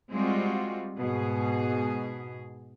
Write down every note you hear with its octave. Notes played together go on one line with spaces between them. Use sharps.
G3 G#3 C4 F4 F#4
G#2 B2 G#4